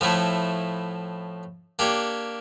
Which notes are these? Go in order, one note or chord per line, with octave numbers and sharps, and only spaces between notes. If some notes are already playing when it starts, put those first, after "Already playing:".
A2 F3 A3 E4
A#3 D4 G4 C#5